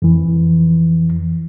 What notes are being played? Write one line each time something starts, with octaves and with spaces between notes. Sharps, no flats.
F2 E3